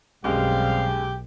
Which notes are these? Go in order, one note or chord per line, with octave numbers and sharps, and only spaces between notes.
B1 F#2 G3 G#3 C4 G4 F5